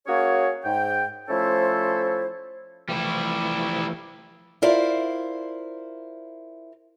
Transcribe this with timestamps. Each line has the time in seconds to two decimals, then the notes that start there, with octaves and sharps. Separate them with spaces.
0.07 A#3 C#4 F#4 G#4 C#5
0.64 G#2 G5
1.29 F3 A3 C#4 E4 A4 C5
2.89 E3 F3 G3 A3 E4
4.62 E4 F4 A#4 C5 D5 F5